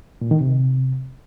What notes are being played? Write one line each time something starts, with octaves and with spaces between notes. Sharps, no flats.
A#2
D#3
C3